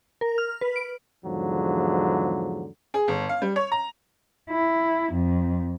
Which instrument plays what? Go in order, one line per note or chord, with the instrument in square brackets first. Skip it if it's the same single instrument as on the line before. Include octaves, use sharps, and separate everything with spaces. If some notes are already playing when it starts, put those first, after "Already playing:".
[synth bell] A#4
F6
B4
D7
[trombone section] E2 G#2 D3 F3 F#3
[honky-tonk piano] G#4
G1
F5
G3
C#5
A#5
[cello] E4
F2